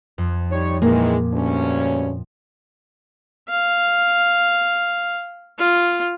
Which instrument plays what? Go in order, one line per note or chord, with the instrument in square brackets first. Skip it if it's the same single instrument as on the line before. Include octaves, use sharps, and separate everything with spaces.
[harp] F2
[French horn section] G3 D#4 C#5
[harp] A#2 [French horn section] D#3 E3 G#3 [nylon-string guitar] A#3
[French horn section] D2 G2 C#4
[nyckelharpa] F5
F4